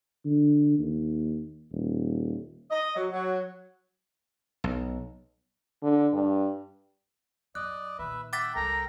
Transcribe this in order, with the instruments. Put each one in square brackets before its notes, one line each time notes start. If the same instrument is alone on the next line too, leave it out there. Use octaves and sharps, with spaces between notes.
[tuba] D3
D#2
D#1
[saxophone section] D#5
F#3
F#3
[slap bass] B1
[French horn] D3
G2
[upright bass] F#2 [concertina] D5 D#5 [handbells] F#6
[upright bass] A#2 D#3 [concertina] B4 E5
[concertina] E5 F#5 G5 [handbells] D6 A6 B6
[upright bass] C2 G3 [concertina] A4 A#4 G5 [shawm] A#5